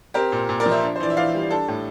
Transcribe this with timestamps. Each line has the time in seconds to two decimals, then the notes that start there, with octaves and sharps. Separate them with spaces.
0.14 C4 G4 A#4
0.32 A#2
0.49 A#2
0.60 A#4 D5
0.66 F3
0.71 C5 E5
0.82 D4
0.96 C5
1.00 E3 D5
1.10 E5
1.17 E3 D5 F5
1.34 G3
1.51 D4 A4
1.68 A2